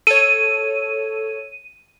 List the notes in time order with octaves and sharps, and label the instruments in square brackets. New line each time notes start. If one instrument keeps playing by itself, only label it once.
[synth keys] A4 C#5 [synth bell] D#7